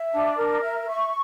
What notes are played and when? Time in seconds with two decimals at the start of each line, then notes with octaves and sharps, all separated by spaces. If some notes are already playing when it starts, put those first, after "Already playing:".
Already playing: E5
0.11 D4
0.36 A#4
0.62 E5
0.88 C#6